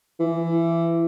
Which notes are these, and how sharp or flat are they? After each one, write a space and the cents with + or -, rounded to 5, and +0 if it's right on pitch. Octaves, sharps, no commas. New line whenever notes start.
E3 +20